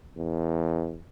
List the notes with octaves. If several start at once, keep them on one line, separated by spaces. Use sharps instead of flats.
E2